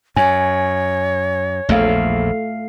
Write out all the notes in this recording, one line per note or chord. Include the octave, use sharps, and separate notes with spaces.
F#2 C#5 G#5
A#1 E2 A3 F5